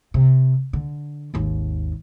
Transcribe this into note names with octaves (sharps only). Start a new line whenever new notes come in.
C3
D3
G#1 D#2